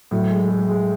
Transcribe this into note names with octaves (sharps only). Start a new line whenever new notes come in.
A2 F#3
G#3
G#3
G#3